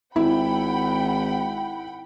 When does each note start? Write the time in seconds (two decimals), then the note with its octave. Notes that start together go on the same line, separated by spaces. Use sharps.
0.16 G#1 E4 F#5 G5 B5